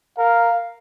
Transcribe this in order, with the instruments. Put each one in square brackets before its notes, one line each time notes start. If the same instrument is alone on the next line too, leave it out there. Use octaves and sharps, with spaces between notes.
[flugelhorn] A#4 [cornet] F5